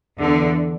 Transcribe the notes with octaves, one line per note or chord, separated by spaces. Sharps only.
E2 D3